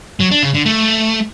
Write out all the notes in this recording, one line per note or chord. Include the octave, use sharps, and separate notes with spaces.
F#3
D4
C#3
D3
A3